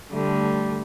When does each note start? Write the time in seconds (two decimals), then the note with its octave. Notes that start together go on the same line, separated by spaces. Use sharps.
0.12 D3 G3 A3